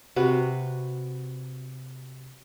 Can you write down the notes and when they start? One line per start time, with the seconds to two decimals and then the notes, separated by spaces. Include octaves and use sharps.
0.16 C3 F#4 B4